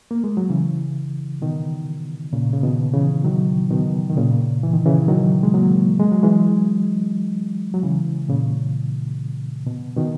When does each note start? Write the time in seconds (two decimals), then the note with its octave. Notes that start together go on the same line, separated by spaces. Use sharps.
0.11 A#3
0.24 G#3
0.37 F#3
0.50 C#3 E3
1.42 B2 D#3
2.33 A#2 C#3
2.53 C#3
2.63 B2 D#3
2.94 C#3 E3
3.24 D#3 F#3
3.71 B2 D#3
4.09 D#3
4.17 A#2 C#3
4.63 E3
4.73 D#3
4.86 C#3 E3
5.08 D#3 F#3
5.43 G#3
5.54 F#3 A#3
5.99 G#3
6.12 F#3
6.23 E3 G#3
7.74 F#3
7.83 C#3 E3
8.29 A#2 C#3
9.67 B2
9.97 B2 D#3